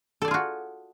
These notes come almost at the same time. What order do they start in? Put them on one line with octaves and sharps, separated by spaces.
A4 D5 G#4 F4 F#4